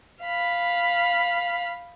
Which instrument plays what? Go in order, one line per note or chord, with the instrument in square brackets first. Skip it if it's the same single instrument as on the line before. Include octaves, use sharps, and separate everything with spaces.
[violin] F5 B5